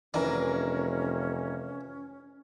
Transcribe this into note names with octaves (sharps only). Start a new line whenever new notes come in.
F1 E3 C#4 D4 A#4 G#5